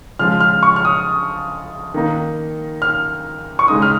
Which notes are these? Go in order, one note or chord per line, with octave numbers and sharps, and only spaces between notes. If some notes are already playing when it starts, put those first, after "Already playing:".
C#3 F3 G#3 F4 F6
F6
C#6
F6
D#6
D#3 A#3 D#4
F6
C#6
C#3 G#3 D#4 D#6
F6